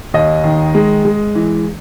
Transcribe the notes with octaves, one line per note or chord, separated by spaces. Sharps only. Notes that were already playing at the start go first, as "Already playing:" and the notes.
D#2 D#5
D#3
G#3
G#3
E3